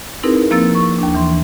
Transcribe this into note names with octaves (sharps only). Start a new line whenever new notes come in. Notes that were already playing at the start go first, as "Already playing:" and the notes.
C4 D#4 E4 G#4 A#4 B4
F3 A#3 C4 E6 A6
C#6
D#2 D4
E3 C6